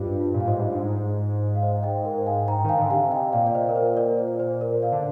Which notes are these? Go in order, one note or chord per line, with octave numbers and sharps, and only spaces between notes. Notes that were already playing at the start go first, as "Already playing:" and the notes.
Already playing: G2 F4 G4 C5 D#5
F4
A#2
F5
G#2 C5 D#5
G2
G#2
F5
C5 D#5
D#5 G5
A#4
F5 G#5
G#2 G5 A#5
D#3 F5 G#5
D3
C3 F5 G#5
D#5 G5
A#2 D5 F5
D5
C5 D#5
A#4
C5
A#4 D5
C5
C5
A#4 D5
D5 F5
D3